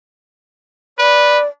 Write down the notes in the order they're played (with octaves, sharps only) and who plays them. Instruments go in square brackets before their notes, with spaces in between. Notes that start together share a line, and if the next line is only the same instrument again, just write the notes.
[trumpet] B4 [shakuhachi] D5